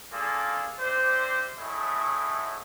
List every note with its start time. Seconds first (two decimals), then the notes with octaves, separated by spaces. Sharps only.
0.11 A#3 D4 F4 G#4 A4
0.79 C3 D4 C5
1.57 A2 F#3 G#3 A3 E4